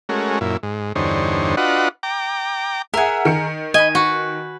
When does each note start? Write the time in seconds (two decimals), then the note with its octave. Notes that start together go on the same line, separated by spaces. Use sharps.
0.09 G#3 A3 C#4 F#4 A#4
0.41 F#2 A#2 E4
0.63 G#2
0.95 E2 G2 D3 D#4 C5 C#5
1.57 D4 F4 F#4 B4 D#5 F#5
2.03 G5 A#5 D6
2.94 G#4 A#4 E5 F#5
3.25 D#3 C#7
3.74 D#5 G#5 B5
3.95 F#4 B4